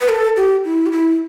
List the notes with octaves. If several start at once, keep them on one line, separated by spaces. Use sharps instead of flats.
B4
A4
G4
E4
G4
E4